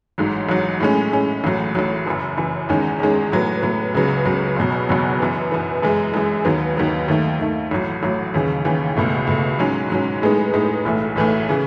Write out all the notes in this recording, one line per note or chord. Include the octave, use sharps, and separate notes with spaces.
A1 G#2 F#3
A1 G#2 F#3
A2 G#3 C#4
A2 G#3 C#4
A1 A2 F#3
A1 A2 F#3
F#1 F#2 E3
F#1 F#2 E3
E2 D#3 G#3 C#4
E2 D#3 G#3 C#4
A2 F#3 B3
A2 F#3 B3
C#2 C#3 F#3 B3
C#2 C#3 F#3 B3
F#1 E2 B2 F#3
F#1 E2 B2 F#3
F#2 E3 B3
F#2 E3 B3
F#2 E3 G#3
F#2 E3 G#3
D#2 D#3 F#3 B3
D#2 D#3 F#3 B3
D#2 D#3 A3
D#2 D#3 A3
A1 A2 F#3
A1 A2 F#3
D#2 C#3 E3
D#2 C#3 E3
C#2 B2 A3
C#2 B2 A3
G#2 F#3 C#4
G#2 F#3 C#4
A2 G#3 B3 D#4
A2 G#3 B3 D#4
B1 A2 E3 A3
B1 A2 E3 A3
C#3 E3